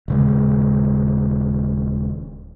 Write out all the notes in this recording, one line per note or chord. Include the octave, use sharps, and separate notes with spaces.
D#1 C#3 G#3